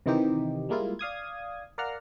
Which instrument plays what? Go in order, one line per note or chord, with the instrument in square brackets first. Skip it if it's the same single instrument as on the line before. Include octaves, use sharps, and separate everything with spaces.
[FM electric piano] C3 D#3 E3 C4 D#4 G4
G3 G#3 A#3 E4 F4
D5 F5 D#6 G#6
A#4 D5 F5 F#5 A#5 F6